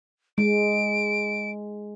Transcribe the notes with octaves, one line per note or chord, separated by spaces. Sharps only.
G#3 D7